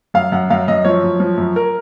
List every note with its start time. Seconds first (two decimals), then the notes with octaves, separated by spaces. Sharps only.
0.14 F#2 F5
0.32 F#2 F#5
0.50 F#2 F5
0.68 F#2 D#5
0.85 F3 C#5
1.03 F#2
1.20 F3
1.38 F#2
1.56 A#4